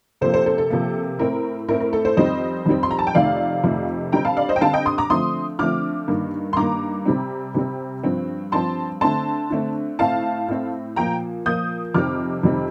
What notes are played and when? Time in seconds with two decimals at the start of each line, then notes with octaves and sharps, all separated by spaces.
0.21 C3 F3 A#3 A4 C5
0.34 A4 C5
0.46 A4 C5
0.58 A4
0.70 C3 F3 A#3
1.19 A2 A3 C4 A#4
1.68 A2 A3 C4 A#4
1.80 A#4
1.93 A4
2.05 A4 C5
2.17 F2 D#3 G3 C4 C5 D#5
2.66 F2 D#3 G3 C4
2.83 C6
2.91 A#5
2.99 A5
3.07 G5
3.14 F2 C3 D#3 A3 D5 F5
3.64 F2 C3 D#3 A3
4.12 D3 G3 C4 G5 A#5
4.25 F5 A5
4.37 D5 F5
4.49 C5 D#5
4.56 G5
4.61 D3 G3 C4 F5 A5
4.73 D#5 G5
4.86 C6 D#6
4.98 A#5 D6
5.10 D3 F3 A3 C4 C6 D#6
5.59 D3 F3 A3 C4 D6 F6
6.08 G2 D#3 A#3
6.53 C6
6.57 G2 D#3 A#3 A#5 D6
7.06 C3 G3 C4
7.54 C3 G3 C4
8.04 G2 F3 C4
8.52 G2 F3 C4 A5 C6
9.01 D3 A3 C4 A5 C6
9.50 D3 A3 C4
9.99 A2 A3 C4 F5 A5
10.48 A2 A3 C4
10.96 A#2 F3 A#3 G5 A#5
11.45 A#2 F3 A#3 D#6 G6
11.94 F2 C3 D#3 G3 C4 D6 F6
12.43 F2 C3 D#3 G3 C4